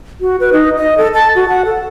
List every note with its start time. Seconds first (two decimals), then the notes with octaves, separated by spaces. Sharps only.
0.21 F#4
0.40 B4
0.53 D#4
0.77 D#5
0.98 A4
1.14 A5
1.35 F#4
1.49 F#5
1.65 A4